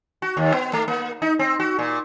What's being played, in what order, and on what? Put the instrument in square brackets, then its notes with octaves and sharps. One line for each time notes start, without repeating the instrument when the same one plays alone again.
[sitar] F#4
D#2
B3
A3
A#3
D#4
C4
F#4
A#2